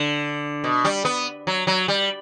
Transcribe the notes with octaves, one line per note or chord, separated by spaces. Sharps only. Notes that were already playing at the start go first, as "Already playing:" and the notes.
Already playing: D3
B2
G3
B3
F#3
F#3
G3